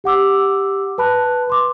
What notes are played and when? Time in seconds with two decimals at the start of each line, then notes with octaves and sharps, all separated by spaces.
0.04 G4 F#5 D6 E6
0.98 B4 A5 B5 F#6
1.47 B4 C6 D6